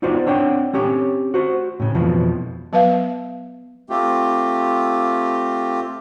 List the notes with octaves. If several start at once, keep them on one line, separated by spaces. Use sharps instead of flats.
B3 D#4 F4 F#4 C5 D5
C4 D4 C#5 F#5 G5
C4 C#4 G4 C#5
F#4 C5
A2 C#3
F2 B2 E3 F3
F#3 B3 B4 E5 F5
A3 C4 F4 G4